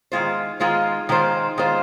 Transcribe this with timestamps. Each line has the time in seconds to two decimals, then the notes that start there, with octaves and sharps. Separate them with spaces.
0.12 D#3 G#3 F4 C5
0.60 D#3 G#3 F4 C5
1.09 D#3 G#3 F4 C5
1.58 D#3 G#3 F4 C5